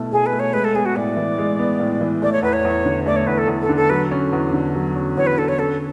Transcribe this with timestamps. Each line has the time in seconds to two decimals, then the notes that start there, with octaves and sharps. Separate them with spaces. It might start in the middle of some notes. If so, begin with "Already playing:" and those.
Already playing: B2 A3 E4 A4
0.12 B2 G#4
0.26 B4
0.32 A3
0.40 C#5
0.53 G#3 B4
0.64 A4
0.75 B3 G#4
0.85 F#4
0.96 A2 D5
1.16 E3
1.38 G#3
1.59 B3
1.80 A2
2.01 E3
2.22 A3 D5
2.33 C#5
2.43 E2 B4
2.53 C#5
2.64 E2
2.85 D3
3.06 A3 D5
3.16 C#5
3.27 E2 B4
3.38 A4
3.48 E2
3.62 A4
3.69 D3
3.76 A4
3.90 F#3 B4
4.11 C#4
4.32 E2
4.53 D3
4.74 F#3
4.96 C#4
5.17 E2 C#5
5.27 B4
5.38 D3 A4
5.48 C#5
5.58 C#4 A4